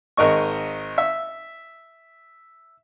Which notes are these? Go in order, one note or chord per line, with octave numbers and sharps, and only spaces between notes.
G#1 A#4 D#5 C#6
E5